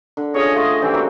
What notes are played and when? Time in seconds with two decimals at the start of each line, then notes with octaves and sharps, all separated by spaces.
0.17 D3
0.34 C#4 F4 G#4 C#5 D#5
0.55 A3 F4 G#4 D#5 F#5 C#6
0.82 G#2 E3 G3 C4 C#4
0.94 A#3 F#4 G5